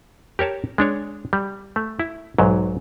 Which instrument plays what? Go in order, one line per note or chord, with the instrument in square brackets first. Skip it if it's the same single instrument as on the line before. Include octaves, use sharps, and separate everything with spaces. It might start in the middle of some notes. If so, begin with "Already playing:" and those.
[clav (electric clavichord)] G4 A#4 C#5 A5
G#3 D4 C#5
G3
A3
E4
B1 G#2 F#3